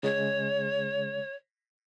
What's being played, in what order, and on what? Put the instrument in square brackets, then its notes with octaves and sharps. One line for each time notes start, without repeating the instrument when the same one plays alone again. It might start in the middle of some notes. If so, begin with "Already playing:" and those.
[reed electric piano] C#3 G#3 [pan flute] C#5